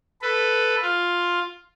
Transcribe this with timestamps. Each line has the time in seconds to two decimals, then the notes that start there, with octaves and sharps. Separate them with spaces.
0.22 A4 B4
0.82 F4